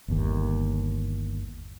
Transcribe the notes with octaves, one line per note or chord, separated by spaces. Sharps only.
G1 D#2